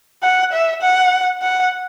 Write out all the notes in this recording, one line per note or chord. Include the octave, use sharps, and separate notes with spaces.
F#5
E5
F#5
F#5